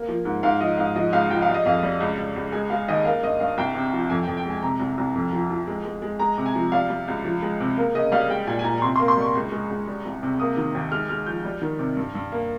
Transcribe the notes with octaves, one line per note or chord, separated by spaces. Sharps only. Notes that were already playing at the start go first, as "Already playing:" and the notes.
Already playing: A#3
F3
G#2
G#2 F5
F3 D#5
G#2 F5
F3 D#5
C#2 F5
F3 G5
F5
G3
D#5
F2 F5
G3
C#2
C#2
C#2
G#3 G#5
G#3 F5
D#2 D#5
A#3 F5
G2 D#5
G2 F5
C2 G5
C3
F3
F2 G#5
F2 G5
G5
G#3 G#5
C3 A#5
C2
C2
F2
F3
F3
G#3
G#3
G#3
G#3 A#5
C3
G#5
F3
G3 F5
G3
C#2
F3
G#3
C3
A#3
C#3 D#5
G3 F5
G#3 G5
A#2 G#5
G#5
A#2 A#5
A#5
C3 C6
C6
A#3
C6
G3 C#6
C#2
G#3
C#2
G3
C2
C3
A#3 D#6
D#3
D#2
G#3 F6
G#3 F6
F3 G6
G3
D#3
C3
G2
G2
A#3